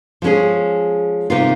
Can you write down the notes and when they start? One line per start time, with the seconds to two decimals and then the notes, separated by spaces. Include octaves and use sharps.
0.22 F3 G#3 C#4 G#4
1.30 C3 D#3 A#3 F4